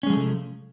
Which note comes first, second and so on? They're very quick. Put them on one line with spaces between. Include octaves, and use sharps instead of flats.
C#4 G#3 F3 A3 C3